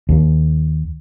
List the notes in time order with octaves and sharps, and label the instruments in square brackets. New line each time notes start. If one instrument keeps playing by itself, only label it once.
[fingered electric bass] D#2